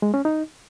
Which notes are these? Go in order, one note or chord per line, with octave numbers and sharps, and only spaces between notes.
G#3
C#4
D#4